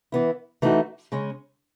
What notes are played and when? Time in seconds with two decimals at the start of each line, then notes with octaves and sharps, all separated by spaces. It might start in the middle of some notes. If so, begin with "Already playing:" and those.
0.12 E3 B3 E4
0.62 E3 A3 D#4 F#4
1.12 C#3 G#3 C#4